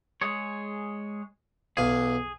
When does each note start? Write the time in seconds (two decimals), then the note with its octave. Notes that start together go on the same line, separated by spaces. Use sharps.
0.21 G#3 G#4 C#5
1.77 B1 E2 G#4 F5